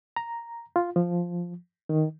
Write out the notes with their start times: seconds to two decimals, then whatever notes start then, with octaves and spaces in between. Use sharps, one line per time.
0.16 A#5
0.76 F4
0.96 F3
1.89 D#3